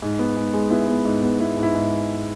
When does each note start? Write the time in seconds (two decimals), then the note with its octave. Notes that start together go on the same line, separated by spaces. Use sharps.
0.02 G#2
0.19 B3
0.36 G#2
0.54 G#3
0.70 B3 E4
0.88 B3
1.05 G#2
1.23 B3
1.40 B3 E4
1.57 G#2
1.63 E4
1.74 G#2